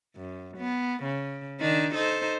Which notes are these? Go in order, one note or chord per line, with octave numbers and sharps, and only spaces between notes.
F#2
B3
C#3
D#3 D4 D#4
D#4 A4 C5